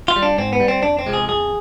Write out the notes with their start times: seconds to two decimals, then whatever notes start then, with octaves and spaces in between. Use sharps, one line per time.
0.08 F4
0.16 G3
0.23 D4
0.38 G#2 C4
0.53 B3
0.60 G3
0.68 C4
0.83 F2 D4
0.99 C4
1.06 C3 F3 G#3
1.13 G#4
1.28 F2 G#4